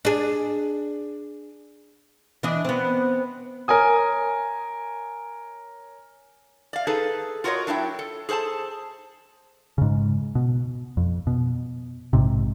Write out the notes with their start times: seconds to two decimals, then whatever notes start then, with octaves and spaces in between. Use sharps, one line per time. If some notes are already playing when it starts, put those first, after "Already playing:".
0.05 D4 G#4
2.43 E3 D4 D#5
2.65 B3 C4
3.68 A#4 C#5 G#5 D#6
6.73 D5 F5
6.87 D#4 G#4 A4 B4
7.44 F4 F#4 A#4 C5 C#5 D#5
7.67 F#3 D4 E4 E5 G5
7.99 A4
8.29 G#4 A4 C5 G#5 A5
9.78 G#2 C#3
10.35 B2
10.97 F2
11.27 B2
12.13 A#1 G#2 C3